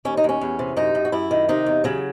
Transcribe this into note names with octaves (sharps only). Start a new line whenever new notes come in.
D#2 C#4
D#4
D#2 C#4
E2
C3
F#2 D#4
F#2
F#4
F#2 E4
D#3
C3 D#4
E2
C#3 F#3